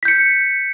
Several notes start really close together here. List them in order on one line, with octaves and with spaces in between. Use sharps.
B6 G6 C#7